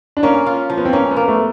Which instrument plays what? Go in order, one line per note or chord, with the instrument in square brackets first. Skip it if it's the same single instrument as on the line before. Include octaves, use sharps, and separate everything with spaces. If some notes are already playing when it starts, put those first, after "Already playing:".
[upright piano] D4
[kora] A#3 [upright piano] C#4
[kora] F4
F3
[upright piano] B3
C4
[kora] A#3 [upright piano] C#4
[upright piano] B3
[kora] A#3
[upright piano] A3